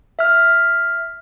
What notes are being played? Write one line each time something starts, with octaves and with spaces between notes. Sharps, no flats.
E5 F6